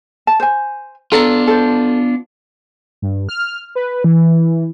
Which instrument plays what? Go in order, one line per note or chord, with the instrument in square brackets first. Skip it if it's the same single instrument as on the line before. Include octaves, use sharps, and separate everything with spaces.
[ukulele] A5
C5 G#5
[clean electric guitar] B3 D4 F4 [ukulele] A4 A#5
[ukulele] A4 C5
[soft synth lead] G2
F6
B4
E3